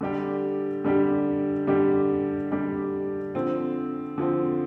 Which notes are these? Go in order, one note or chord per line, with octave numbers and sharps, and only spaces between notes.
D3 G3 D4 G4
D3 G3 D4 G4
D3 G3 D4 G4
D3 G3 D4 G4
D3 F3 C4
D3 F3 C4